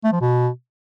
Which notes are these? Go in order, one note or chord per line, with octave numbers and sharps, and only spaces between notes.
A3
F3
B2